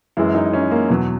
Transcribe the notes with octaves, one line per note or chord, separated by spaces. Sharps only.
F#2 E3 G#3 E4
D#4
C#4
A#3
E2 B2 F#3